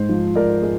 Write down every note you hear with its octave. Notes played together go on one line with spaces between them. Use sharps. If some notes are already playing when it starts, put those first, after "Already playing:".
Already playing: G#2 G#3 C5
F3
G#2 A#4 D5
G#3